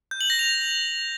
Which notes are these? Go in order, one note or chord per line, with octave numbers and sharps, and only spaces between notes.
G6
F#7
A#6
F7